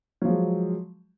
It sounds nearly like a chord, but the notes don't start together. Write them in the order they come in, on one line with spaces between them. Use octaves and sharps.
F#3 F3 G#3